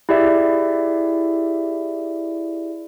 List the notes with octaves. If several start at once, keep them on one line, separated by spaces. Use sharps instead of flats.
E4 G4 G#4 D5 E5